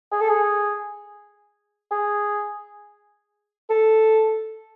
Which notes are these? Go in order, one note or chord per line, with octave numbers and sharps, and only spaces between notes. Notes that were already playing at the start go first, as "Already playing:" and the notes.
G#4
A4
G#4
G#4
A4